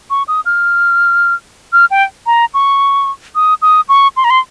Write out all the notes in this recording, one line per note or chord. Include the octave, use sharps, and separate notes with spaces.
C#6
D#6
F6
F6
G5
A#5
C#6
D#6
D#6
C#6
C6
A#5
C6